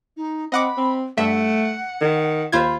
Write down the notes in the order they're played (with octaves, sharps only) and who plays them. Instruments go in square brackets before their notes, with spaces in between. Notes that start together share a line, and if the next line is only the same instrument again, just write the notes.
[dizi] D#4
[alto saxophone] C4 [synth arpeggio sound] D#5 F#5 D6 [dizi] B5
[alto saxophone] C4
[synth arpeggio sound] G2 E5 [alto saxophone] A3 [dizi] F#5
[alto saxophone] D#3
[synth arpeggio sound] D#2 C5 G#6 [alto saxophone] F4 [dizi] B5